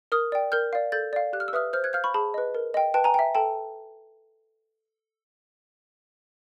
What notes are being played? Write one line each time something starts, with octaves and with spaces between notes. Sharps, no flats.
A#4 D#6 F6
D5 G5
A#4 F6 G6
D5 F5
A4 G6 A6
D5 F5
G4 F#6
F6
E6
B4 E5 D#6 F6
C5 F6 G6
F#6 G#6
F5 F6 G6
B5 C#6
G#4 A5 B5
B4 D#5
A#4
D#5 G5
B4 G5 A5
G#5 A#5
E5 G5
A4 G5 A5